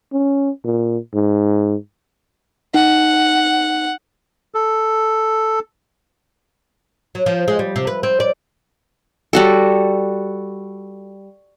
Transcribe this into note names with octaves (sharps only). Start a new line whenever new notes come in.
C#4
A#2
G#2
D#4 F#5
A4
F#3
F3
G#3
G3
C3
B4
C4
D5
G3 F#4 A4